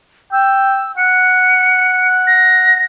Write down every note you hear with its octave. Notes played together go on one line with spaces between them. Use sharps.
G5 E6
F#5 C#7
A#6